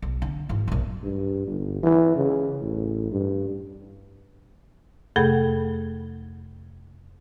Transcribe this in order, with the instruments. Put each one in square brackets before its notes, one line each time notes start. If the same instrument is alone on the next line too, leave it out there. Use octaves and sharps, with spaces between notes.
[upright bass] B1
D3
G#1 E3
A#1 F#2
[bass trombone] G2
G1
E3
C#3
A1
G2
[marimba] F2 C3 A3 G#4 A4 B5